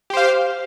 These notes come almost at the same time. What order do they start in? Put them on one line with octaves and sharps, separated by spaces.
G4 C5 F5